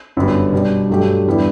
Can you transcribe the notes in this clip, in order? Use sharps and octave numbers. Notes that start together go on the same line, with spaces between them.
G1 F#2 D3 G3 B3
B2 G3 D4
G2 F#3 A3 D4 G4
E2 D3 G3 B3 E4